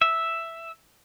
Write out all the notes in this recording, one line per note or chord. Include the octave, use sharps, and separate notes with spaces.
E5